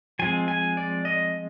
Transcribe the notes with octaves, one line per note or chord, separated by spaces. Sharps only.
F3 G#3 C4 G#5
G#5
D5
D#5